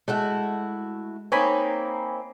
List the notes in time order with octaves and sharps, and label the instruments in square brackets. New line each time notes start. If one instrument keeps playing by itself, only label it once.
[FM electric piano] G#3 [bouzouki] A3 E4 F#4
[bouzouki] A#3 C4 D#4 [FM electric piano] C#5 G#5 B5